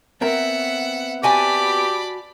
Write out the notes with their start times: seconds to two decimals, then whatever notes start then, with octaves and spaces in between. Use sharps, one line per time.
0.21 B3 C4 A#4 E5 F#5
1.23 F#4 G4 D5 G#5 A5 B5